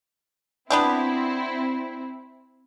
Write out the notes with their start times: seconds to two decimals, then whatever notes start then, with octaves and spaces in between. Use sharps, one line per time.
0.70 B3 C4 D4 E4 G4